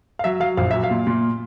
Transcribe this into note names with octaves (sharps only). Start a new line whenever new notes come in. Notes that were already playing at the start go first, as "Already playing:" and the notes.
F5
F#3 E5
F#3 F5
A#1 F5
F#3 E5
F5
A#2
A#2